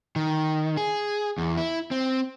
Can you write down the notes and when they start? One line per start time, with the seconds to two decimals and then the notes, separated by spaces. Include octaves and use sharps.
0.16 D#3
0.77 G#4
1.38 E2
1.57 E4
1.91 C4